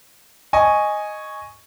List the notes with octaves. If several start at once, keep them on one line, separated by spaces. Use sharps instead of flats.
D#5 G#5 C#6